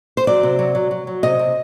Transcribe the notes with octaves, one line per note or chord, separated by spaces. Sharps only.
C5
F#3 D5
C3
F#3
F#3
F#3
F#3
C3 D#5
C3